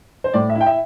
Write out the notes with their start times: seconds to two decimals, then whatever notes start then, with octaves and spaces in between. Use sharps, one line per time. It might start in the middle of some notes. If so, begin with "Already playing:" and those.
0.24 C5
0.34 A2 D5
0.50 E5
0.56 E4
0.61 G5
0.66 E5